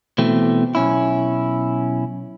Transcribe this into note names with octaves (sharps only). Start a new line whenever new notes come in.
B2 E3 A3 C4
B1 C#4 E4